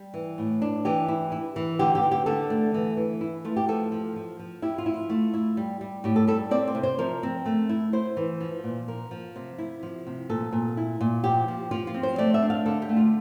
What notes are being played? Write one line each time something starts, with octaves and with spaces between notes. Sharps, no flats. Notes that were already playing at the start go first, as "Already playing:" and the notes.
Already playing: G3
E3
A2
D4
E3 G4
E4
E4
E3
D3 G4
G4
D3
G4
D3 A4
A3
E3
E3
E4
A3 F4
G4
F3 A4
F3
F3
F3
E4 G4
F4
E4
F4
A3
E4
G3
G3
A2 G4
A4
G3 A4
C4 D5
C5
C3
C5
F3 A#4
C4
A3
E4
E4 C5
E3
F3
A#2
F3 A#4
F3
C3
E4
F3
C3
A#2 A4
A#2
E4
A#2
F3 G4
F3
F3 F4
F4
C4
C5
A3 D5
E5
D4
F5
D3 A4
G4
A3
F4